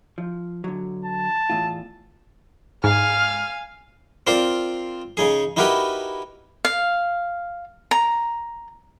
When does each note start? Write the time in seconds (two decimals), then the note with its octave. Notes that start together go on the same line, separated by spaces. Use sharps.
0.18 F3
0.64 D3 F#3
1.05 A5
1.50 E2 A2 F4
2.84 G#2 F5 G#5 F6
4.27 C4 F4 A#4 C5 D5
5.17 C#3 D#4 G#4
5.57 D#4 E4 F#4 G4 A#4 B4
6.65 F5
7.91 A#5